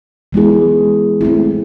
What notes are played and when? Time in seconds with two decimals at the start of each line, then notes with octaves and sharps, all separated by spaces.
0.33 E3 G#3 B3 E4 G#4
1.21 A3 C4 E4